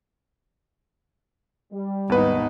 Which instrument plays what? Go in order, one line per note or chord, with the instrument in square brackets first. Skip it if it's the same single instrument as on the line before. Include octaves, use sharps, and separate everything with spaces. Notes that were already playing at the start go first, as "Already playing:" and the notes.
[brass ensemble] G3
[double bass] G#1 D#4 [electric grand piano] D#2 B4 [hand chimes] B3 F#5